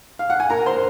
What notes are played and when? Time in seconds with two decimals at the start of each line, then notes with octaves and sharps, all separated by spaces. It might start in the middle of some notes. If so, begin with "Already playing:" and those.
0.19 F5
0.30 F#5
0.40 G#5
0.50 A#2 A#4 A#5
0.66 C5 C6